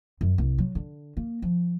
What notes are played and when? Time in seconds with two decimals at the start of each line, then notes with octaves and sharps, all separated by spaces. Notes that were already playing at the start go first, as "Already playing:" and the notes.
0.21 F#2
0.38 C2
0.58 F#3
0.75 D3
1.17 A#3
1.42 F3